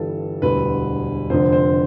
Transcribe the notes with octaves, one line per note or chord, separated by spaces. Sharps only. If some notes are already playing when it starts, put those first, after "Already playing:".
Already playing: G1 G2 E3 G3 A4
E1 D2 D3 G3 B4
F1 F2 D3 C5
C5